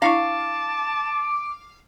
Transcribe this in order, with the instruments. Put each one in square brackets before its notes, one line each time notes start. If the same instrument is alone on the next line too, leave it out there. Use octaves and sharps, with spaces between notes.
[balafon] D4 E4 C#6 [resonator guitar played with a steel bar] F5 [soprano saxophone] A5 [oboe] D6